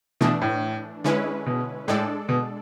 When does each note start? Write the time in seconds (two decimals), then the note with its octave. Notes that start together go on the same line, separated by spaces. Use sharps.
0.21 B2 E3 A3 D4
0.42 A2
1.04 D3 G#3 C#4 E4 B4
1.46 B2
1.88 A2 G#3 D4 A4 D5
2.29 B2